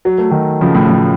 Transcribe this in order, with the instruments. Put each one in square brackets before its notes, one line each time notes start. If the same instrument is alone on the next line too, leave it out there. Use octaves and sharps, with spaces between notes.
[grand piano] F#3
A3
D#3 F#3
C#3 F3
A2
A2